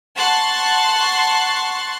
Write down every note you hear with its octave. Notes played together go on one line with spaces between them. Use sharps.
F#5 A5 C6 C#6 F#6 A6